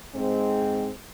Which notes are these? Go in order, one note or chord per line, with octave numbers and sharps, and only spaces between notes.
G#2 G#3 C4